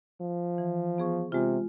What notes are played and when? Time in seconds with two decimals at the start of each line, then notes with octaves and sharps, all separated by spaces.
0.21 F3
0.58 E3
0.98 B3 G#4 C#6
1.32 C3 G#3 F4